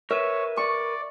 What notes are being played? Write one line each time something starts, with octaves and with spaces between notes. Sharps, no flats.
A#4 B4 C#5 E5
D5 C#6